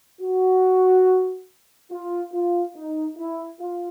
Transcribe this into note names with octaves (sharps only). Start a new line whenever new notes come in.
F#4
F4
F4
D#4
E4
F4